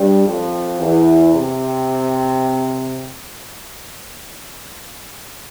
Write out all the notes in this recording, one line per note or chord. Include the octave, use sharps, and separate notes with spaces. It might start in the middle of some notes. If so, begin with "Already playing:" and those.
Already playing: G2 G3
F2 F3
E2 E3
C3 C4